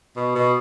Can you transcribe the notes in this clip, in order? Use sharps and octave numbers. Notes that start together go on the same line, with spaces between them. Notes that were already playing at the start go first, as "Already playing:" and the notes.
B2
B2